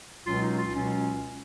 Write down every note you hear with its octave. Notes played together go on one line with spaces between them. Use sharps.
C#2 B2 F#3 C#4 F4
D#4
F4
C#2 B2 F#3 C#4